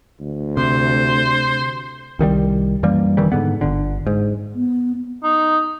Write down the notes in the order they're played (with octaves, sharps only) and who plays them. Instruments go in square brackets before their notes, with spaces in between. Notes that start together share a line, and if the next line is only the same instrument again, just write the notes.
[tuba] D2
[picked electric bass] C3 [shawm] C5
[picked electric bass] C2 D#3 E3 G3
F#2 E3 G3 A#3
F1 D#3 E3 G3
G#2 D3 B3
G1 D3
G#2
[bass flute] B3
[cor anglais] D#4